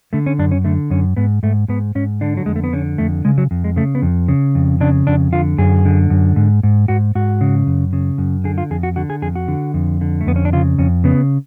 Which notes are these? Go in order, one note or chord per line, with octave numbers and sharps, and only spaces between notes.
D3 A3
C#4
F#2 D4
C#4
D3 A3
F#2 C#4
G#2 B3
G#2 A3
G#2 B3
G#2 C#4
D3 D4
F#3
F2 G#3
A3
B3
D3 C#4
F2 A3
C#3 G#3
F#3
F2
G#3
C#3 A3
B3
F2
C#3
F2
C#3 D4
F2 D4
D3 F4
F#2 G#4
D3
F#2
G#2
G#2
G#2 F#4
G#2 F#4
C#3
F#2
C#3
F#2
D3 G#4
F4
F2 G#4
F#4
D3 F#4
G#4
F2 G#4
F#4
D3
F2
D3
A3
F2 B3
C#4
D4
C#3 F4
F2 C#4
C#3 B3